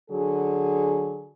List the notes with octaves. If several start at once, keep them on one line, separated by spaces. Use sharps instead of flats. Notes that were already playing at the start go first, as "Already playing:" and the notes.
D3 F#3 G#4